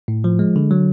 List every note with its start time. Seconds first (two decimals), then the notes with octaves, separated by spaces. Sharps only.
0.08 A2
0.24 F3
0.39 G#3
0.56 D3
0.71 F#3